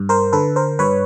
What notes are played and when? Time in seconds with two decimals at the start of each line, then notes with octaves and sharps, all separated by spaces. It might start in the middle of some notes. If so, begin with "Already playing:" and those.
Already playing: G2
0.09 A#4 C5
0.33 D3 A4 B4
0.56 A#4 C5
0.79 G2 B4 C#5